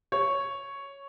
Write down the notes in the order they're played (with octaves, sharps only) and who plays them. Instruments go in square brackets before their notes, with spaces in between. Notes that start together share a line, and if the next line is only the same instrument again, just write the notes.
[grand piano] C#5